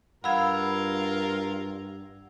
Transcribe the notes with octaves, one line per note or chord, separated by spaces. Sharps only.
G2 F4 A#4 F5 F#5 B5 E6 G#6